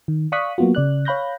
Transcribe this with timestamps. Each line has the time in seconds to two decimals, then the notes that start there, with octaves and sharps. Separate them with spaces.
0.08 D#3
0.32 D5 F5 C#6 D#6 F#6 B6
0.58 F#3 A#3 B3 F4 F#4
0.75 C#3 D5 F#6
1.05 C#5 F5 B5 F#6 G6 A#6